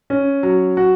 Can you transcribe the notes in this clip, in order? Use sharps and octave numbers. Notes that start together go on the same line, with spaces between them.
C#4
F#3
F#4